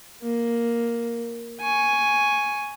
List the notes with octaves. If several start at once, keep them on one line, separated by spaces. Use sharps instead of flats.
A#3
G#5 C#6